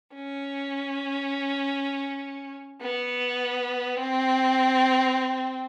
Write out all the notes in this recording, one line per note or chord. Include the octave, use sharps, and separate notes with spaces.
C#4
B3
C4